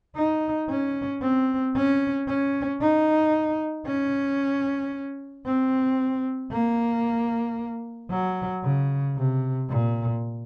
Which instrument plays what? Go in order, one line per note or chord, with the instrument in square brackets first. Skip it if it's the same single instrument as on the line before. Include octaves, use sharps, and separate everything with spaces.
[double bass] D#4
C#4
C4
C#4
C#4
D#4
C#4
C4
A#3
F#3
C#3
C3
A#2